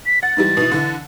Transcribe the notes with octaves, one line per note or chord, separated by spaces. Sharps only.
B6
F#5 A6
G#2 E3 G3
B2 E3
D3 E3